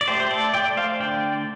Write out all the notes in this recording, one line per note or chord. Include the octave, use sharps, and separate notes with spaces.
D5
A3 G4 C5
C5
A4 D5
A3 D5 G5
C5 F5
D3 D5 G5